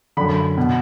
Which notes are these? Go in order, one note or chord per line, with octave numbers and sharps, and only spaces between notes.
F#2 D3 B5
B2